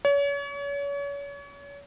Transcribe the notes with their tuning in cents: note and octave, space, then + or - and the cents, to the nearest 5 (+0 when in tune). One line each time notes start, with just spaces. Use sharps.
C#5 +35